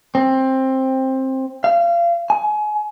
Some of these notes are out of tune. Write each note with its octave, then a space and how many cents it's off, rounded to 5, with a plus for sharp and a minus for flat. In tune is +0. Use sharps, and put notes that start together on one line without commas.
C4 +15
F5 -30
G#5 +30